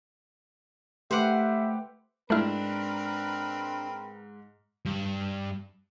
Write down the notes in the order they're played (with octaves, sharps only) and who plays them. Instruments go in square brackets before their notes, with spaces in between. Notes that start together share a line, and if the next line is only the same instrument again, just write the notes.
[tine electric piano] A3 [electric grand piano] G4 B4 D6 [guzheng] C5 F#5 [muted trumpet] E5
[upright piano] G#2 F6 [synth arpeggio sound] A3 E4 [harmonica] C4 A#4 B4 [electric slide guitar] D4
[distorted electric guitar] G2